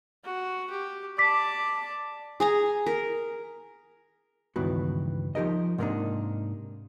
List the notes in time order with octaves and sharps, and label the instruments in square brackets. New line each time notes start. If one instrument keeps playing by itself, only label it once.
[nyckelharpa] F#4
G4
[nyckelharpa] D5 A5 [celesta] D6 B6
[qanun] G#4 G#5 A#5
A#4
[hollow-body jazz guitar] C#2 G2 D#3 E3 B3 F#4
F3 D#4 G4 A#4 D#5
G#2 C3 A#3 C4 D4 D#4